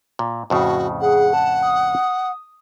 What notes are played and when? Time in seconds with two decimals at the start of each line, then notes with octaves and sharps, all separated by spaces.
0.19 A#2
0.50 F2 A2 C#3 F#4
1.01 G#4 F#5
1.33 A5
1.63 D#6